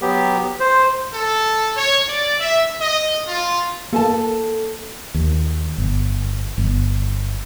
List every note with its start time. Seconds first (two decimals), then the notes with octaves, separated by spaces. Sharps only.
0.02 F#3 B3 G4
0.60 C5
1.12 A4
1.76 C#5
2.06 D5
2.39 E5
2.79 D#5
3.27 F4
3.93 A#3 A4 G#5 A5
5.14 D#2
5.78 G1
6.58 G1